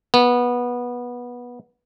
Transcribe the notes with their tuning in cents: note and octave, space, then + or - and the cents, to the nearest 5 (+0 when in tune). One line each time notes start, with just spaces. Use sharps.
B3 -15